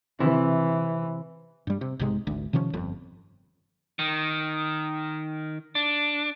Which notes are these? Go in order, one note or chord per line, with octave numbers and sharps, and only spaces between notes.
C3 E3 E4
G2 G3
C3
B1 G#2 C3 G#3
G#1 D2
C3 D#3 F3 C#4
G1 F2
D#3
D4